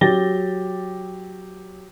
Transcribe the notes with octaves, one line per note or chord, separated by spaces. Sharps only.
F#3 G4 A6 A#6 G7